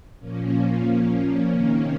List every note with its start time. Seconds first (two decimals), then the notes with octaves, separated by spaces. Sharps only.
0.19 A#2 F3 A#3 C#4
1.50 C3 D#3 A#3 C#4